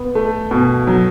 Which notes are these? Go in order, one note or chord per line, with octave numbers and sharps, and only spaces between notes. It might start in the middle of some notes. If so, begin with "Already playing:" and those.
Already playing: B3
A3
B2
F#3